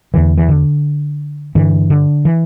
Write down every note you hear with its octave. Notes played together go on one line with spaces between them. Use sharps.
E2 D3 E3
E3
D3
G2 D3 E3
D3
E3